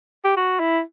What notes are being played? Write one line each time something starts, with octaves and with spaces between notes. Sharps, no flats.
G4
F#4
E4